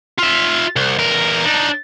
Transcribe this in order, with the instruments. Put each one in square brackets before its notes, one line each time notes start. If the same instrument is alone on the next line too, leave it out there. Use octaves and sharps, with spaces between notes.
[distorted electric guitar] F4 E5
C2
E2 A#4
D4 D#4